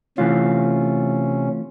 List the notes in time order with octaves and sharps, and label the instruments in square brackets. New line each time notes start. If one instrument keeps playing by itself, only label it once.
[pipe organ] C3 C#4 [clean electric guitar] E3 A3 F4